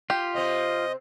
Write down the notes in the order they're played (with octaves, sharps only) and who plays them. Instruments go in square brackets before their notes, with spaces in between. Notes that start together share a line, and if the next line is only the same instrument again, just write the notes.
[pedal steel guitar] F4 [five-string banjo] G4
[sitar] C3 C4 [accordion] D#5